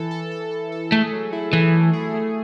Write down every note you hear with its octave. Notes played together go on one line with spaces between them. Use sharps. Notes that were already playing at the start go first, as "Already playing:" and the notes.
Already playing: E3 A4
A4
A4
A4
A4
A3 G#4
F#3
E4
E3 A3
A3
G#4
A3